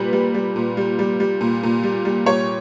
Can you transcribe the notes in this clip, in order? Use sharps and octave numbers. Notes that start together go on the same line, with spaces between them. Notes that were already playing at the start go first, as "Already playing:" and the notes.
Already playing: A#2 G3 B4
G3
G3
A#2
G3
G3
G3
A#2
A#2
G3
G3
G3 C#5